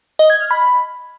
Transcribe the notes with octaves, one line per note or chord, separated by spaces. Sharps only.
D#5
G#6
F6
B5